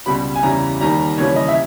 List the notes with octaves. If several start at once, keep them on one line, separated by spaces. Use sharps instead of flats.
C#2 B2 G3 B5
G#5
E2 C#3 E3 G3 A#5
D#2 D#3 G3 A#5
D#2 C#3 E3 G3 C#5
D#5
E5